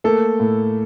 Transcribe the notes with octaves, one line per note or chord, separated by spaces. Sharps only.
A3 A#3 A4
A2